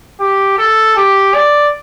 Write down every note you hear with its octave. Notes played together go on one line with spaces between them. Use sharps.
G4
A4
G4
D5